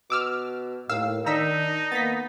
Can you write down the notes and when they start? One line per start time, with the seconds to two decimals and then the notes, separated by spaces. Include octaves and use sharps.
0.10 B2 D6 E6 F6
0.89 D#2 A2 F5 E6
1.26 D#3 D4 D#4 A#5 E6 B6
1.92 A#3 B3 A6 B6